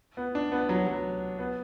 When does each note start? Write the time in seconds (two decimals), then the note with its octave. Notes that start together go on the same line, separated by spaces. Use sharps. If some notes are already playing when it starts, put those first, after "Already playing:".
0.17 B3
0.35 D4
0.52 B3
0.69 F#3
0.87 F#3
1.39 B3